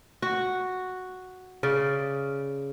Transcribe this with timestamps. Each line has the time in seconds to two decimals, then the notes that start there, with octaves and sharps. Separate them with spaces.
0.22 F#4
1.63 C#3 D5